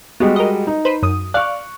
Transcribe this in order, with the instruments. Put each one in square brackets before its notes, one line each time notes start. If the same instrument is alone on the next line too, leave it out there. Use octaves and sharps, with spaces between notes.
[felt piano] G3 G#3 F#4 [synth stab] B3
[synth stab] A#4 D#5
[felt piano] D#4
[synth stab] B4 C5 B5
F#2 D#6
[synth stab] D5 F5 [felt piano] C#6 F#6